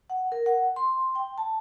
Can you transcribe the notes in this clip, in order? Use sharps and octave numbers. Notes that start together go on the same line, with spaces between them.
F#5
A#4
F#5
C6
G5
A5